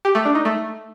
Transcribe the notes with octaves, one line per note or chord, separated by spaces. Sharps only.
G4
A3
D4
D#4
A3